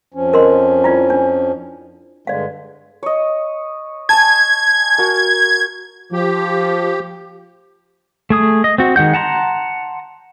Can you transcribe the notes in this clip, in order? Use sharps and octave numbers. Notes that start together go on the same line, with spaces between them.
F2 F3 C#4
A#4 D#5 C6
E4 F4 D5
D4
G2 D3 G#3 D5 F5
C#5 D#5
G#5 A5 G#6
F#4 A#4
F3 G4
A3 G#4 D#6
D#5
C4 F#4
D#3 G#3 F#5 G6
F#5 A5 A#5 C6